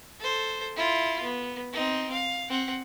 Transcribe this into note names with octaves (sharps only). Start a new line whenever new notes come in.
A4 C5
E4 F4
B3
C4 D#4
F5
C4 F#5